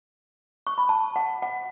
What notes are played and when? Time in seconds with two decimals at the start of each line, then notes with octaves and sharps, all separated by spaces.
0.67 C#6
0.78 B5
0.89 A5
1.16 F#5
1.42 F#5